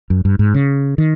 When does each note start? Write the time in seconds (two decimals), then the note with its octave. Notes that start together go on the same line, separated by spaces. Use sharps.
0.10 F#2
0.25 G2
0.39 G#2
0.54 C#3
0.98 D#3